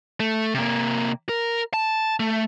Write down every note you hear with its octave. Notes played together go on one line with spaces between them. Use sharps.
A3
C3 A#3
A#4
A5
A3